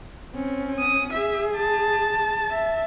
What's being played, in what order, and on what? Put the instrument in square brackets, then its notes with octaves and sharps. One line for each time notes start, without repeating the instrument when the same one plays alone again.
[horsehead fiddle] C4 C#4
[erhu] D#6
[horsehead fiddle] G#4 [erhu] E5
[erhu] A5
[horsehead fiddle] E5